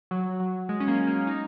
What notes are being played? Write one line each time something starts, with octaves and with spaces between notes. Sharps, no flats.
F#3
F#3
G#3
C#4
A#3
A#3
D#4